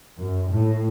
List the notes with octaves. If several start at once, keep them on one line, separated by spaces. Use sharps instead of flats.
F#2
A2